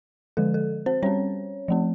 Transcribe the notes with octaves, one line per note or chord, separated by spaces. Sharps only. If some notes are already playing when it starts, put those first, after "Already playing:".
D3 F3 G#3 A4
A4
C4 C5
G3 C4 C#4 C#5
F3 A3 C4